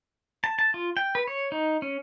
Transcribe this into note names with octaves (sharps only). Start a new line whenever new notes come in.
A5
A5
F4
G5
B4
C#5
D#4
C#4